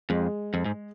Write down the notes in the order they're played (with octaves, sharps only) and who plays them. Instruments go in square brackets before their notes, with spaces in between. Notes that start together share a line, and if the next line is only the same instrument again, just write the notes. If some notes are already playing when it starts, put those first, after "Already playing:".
[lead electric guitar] F2 [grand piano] G#3
[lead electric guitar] F2
G#2